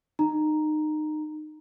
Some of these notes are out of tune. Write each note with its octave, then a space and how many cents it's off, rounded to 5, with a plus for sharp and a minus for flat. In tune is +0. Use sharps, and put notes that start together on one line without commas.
D#4 -25 A#5 +0